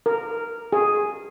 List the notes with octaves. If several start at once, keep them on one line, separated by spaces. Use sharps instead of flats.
A#4
G#4